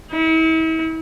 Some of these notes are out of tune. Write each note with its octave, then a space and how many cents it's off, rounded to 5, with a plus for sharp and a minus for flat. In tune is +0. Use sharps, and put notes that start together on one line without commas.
E4 -40